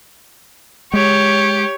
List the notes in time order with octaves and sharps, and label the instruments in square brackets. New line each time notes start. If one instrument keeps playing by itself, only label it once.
[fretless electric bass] G#3 [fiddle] G4 [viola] C#5